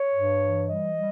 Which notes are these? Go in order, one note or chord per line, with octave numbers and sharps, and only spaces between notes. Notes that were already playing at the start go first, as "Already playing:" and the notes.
Already playing: C#5
G2
E3
G3 D#5
G3